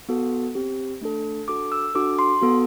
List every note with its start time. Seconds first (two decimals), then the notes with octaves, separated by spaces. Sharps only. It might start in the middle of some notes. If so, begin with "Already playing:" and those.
0.09 B3 F#4 A4
0.55 C4 G4
1.01 A3 D4 A4
1.48 D4 F#4 A4 D6
1.72 E6
1.95 D4 F#4 A4 D6
2.19 C6
2.42 B3 F#4 A4